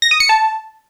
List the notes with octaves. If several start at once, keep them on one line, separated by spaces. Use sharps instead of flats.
A#6
D#6
C#7
A5